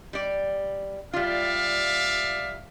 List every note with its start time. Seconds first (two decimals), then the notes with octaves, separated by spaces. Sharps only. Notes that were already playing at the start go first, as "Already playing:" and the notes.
0.13 G3 D5
1.13 G3 F4 D5 E5 F5